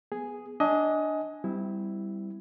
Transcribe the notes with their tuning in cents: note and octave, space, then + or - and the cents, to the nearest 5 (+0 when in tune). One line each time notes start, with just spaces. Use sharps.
B3 +0 G#4 +0
D4 +0 D#5 +20 G#5 +0
G3 +0 C4 -30 E4 +0